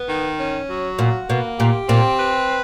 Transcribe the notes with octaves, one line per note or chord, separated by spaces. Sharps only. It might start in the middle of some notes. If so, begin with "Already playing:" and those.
Already playing: B3
D#3
C#4
F#3
A#2 F#4
B2 A#3
A#2 G4
A#2 C4
B4